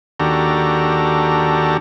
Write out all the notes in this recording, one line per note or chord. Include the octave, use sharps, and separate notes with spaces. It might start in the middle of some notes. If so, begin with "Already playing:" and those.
D#2 D4 F#4 G4 A4 A#5